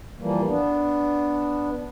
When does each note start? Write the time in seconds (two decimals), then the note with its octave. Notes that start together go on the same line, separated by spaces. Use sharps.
0.19 E3 F3 G3 A#3
0.47 B3 D4